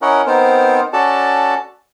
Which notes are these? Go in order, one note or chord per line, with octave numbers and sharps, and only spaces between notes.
C#4 E4 A#4 C#5 D#5 F#5
B3 C4 D#4 A#4 C5
C#4 F#4 A4 D5 A5